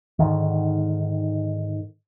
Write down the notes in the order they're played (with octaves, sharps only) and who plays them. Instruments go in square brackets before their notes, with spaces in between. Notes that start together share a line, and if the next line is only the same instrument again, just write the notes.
[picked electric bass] G#2 B2 D3 D#3